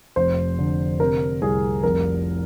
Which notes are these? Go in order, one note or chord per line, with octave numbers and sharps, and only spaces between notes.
F1 C5
D3
C3 A#4
C2 G#4
F1 A#4